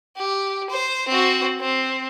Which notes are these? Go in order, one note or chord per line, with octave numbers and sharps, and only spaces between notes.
G4
C5
C4 F#4
C4